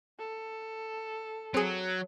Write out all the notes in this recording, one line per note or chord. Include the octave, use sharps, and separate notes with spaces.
A4
F#3 C4 G#4